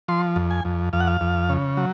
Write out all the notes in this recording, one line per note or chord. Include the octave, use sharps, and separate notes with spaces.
F3 C6
F2
G#5
F2
F2 F5
F#5
F5
F2
C#3
F#3